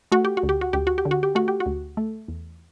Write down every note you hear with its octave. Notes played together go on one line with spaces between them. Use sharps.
A3 F#4
G4
F#4
D2
G4
F#4
D2 G4
F#4
G4
D3
F#4
G4
A3 F#4
G4
F#4
D2
A3
E2